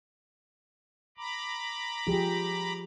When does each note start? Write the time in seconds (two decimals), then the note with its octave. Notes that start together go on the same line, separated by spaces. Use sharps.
1.18 A#5 B5 D6
2.07 F3 G4 G#4